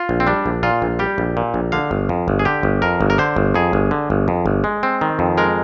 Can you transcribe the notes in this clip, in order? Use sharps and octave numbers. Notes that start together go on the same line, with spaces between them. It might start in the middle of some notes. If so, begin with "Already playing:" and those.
Already playing: F4
A#1
C4
G3 D4
A#1
A#2 F4
A#1
G3 G4
A#1
A#2
A#1
D3 F5
G1
F2
G1
G#4
D3 G4
G1
F2 A#4
G1
A#4
D3 C5
G1
F2 G#4
G1
D3
G1
F2
G1
G#3
C4
D#3
F2
G#3 A#4